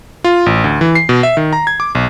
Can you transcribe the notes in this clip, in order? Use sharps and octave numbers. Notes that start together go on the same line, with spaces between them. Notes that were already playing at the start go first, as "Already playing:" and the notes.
F4
A1
D2
E3
C7
B2
E5
D#3
A#5
G#6
D6
B1